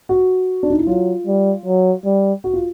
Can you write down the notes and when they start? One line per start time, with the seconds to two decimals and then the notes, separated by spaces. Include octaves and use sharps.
0.09 F#4
0.63 D4
0.70 D#4
0.79 E4
0.87 F#3 F4
1.26 G3
1.65 F#3
2.05 G3
2.44 F#4
2.53 F4